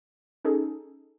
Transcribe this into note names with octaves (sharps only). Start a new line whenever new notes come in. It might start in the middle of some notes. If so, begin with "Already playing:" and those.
C#4 D#4 G#4 A4